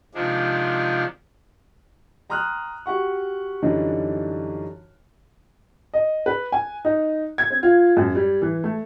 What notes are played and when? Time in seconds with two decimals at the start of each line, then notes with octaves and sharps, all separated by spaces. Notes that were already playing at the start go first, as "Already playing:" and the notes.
0.14 C3 D#3 F3 G#3 D4
2.30 G5 A#5 C6 D#6 F6 F#6
2.86 F#4 G4 F#5 C#6
3.62 F#2 D3 E3 G3 D4 D#4
5.94 D#5
6.26 B4
6.52 G#5
6.85 D#4
7.38 G#6
7.50 C4
7.63 F4
7.97 F#2
8.15 G3
8.42 E3
8.64 A3